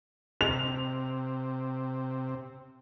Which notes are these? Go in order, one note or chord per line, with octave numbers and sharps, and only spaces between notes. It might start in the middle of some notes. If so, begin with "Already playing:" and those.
C3 F7